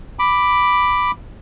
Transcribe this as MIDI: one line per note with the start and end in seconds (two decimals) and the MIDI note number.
0.19 1.11 83
0.19 1.11 86